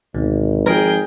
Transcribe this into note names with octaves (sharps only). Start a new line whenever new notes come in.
G#1 D2 B2 D#3
F3 G#4 A#4 G5